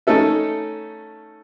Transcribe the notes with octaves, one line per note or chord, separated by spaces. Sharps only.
A3 C#4 D#4 A4 E5